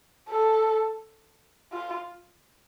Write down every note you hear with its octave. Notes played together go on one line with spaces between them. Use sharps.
A4
F4